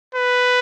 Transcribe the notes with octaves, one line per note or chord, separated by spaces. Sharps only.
B4